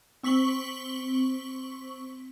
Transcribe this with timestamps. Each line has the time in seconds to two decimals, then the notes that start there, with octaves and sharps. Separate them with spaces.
0.23 C4 C#6 B6 F#7 G7